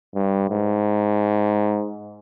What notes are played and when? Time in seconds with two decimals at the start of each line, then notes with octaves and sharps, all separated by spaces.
0.15 G2
0.51 G#2